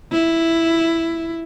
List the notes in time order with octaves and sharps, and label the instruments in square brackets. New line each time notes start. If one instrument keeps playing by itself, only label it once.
[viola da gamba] E4